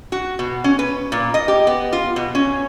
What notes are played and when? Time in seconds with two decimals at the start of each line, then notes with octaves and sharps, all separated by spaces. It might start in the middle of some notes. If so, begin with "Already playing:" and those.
0.12 F#4
0.39 B2
0.64 C#4
0.79 B4
1.12 A#2
1.34 D#5
1.48 G4
1.67 B3
1.93 F4
2.16 B2
2.35 C#4